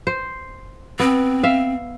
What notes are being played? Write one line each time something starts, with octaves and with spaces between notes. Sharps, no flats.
C5
B3 C4
E5 F5